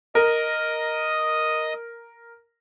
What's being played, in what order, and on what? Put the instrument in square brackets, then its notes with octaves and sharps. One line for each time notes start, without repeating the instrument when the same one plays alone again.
[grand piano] A#4 [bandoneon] D#5 D#6